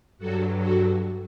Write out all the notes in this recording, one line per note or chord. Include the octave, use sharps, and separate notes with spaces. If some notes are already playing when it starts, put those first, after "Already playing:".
G2 F#3 F#4 A4
F#4 A4